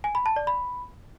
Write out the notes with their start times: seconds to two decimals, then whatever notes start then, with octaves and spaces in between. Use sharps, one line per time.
0.04 G#5
0.15 B5
0.26 A5
0.36 D5
0.47 B5